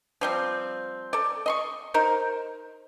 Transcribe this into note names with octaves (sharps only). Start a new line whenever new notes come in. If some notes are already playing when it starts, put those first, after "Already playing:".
F3 G3 C4
A4 D5
D#5 C6 C#6
D#4 A#4 C5